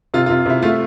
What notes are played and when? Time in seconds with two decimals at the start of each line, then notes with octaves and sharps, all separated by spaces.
0.14 C3 F4
0.26 F4
0.30 C3
0.46 C3 E4
0.62 A3 F4